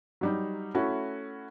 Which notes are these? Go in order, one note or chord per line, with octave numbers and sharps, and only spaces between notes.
F#3 G3 D#4
A3 C#4 E4 F#4